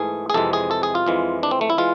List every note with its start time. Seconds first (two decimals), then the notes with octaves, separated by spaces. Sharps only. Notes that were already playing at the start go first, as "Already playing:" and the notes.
Already playing: G#2 E3 A3 G#4
0.30 G#4
0.34 F2 C3 E3 G#3 A4
0.53 G#4
0.71 A4
0.83 G#4
0.95 F4
1.06 F2 E3 G#3
1.43 D4
1.51 C4
1.61 A3
1.70 E4
1.78 E3 G#3 F4